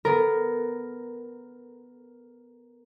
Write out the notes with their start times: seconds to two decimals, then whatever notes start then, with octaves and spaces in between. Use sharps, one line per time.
0.05 B3 A#4